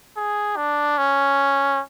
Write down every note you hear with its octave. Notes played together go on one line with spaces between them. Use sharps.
G#4
D4
C#4